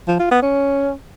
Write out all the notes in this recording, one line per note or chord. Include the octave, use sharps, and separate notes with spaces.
F3
F4
B3
C#4